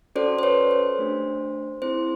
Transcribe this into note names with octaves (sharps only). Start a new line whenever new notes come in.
C#4 F#4 A4 C5 D5
C5
B4 C#5
C5
A3 D4 G4
C4 E4 G#4 C5